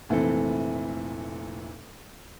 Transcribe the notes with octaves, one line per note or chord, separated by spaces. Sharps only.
F1 A#2 E3 A3 C4 A4